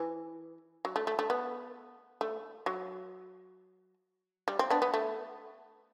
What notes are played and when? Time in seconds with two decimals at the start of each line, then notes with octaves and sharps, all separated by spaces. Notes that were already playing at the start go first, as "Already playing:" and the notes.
Already playing: E3
0.85 F#3
0.96 A3
1.07 A3
1.19 A3
1.30 B3
2.21 A3
2.66 F#3
4.48 G3
4.59 C4
4.70 B3 D4
4.82 B3
4.94 A3